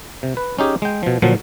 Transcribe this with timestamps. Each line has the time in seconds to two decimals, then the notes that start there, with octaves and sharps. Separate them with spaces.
0.23 C3
0.37 B4
0.59 C#4 D#4 G4 G#4
0.82 G#3 G5
1.03 B2 F3
1.22 A#2 D3 F3 F#3 F#4